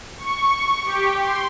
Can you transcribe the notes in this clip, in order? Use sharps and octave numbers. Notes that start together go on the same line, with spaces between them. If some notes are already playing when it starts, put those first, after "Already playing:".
C#6
G4
C6